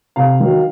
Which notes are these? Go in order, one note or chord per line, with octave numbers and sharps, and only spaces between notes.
C3 F5
D#3 F#3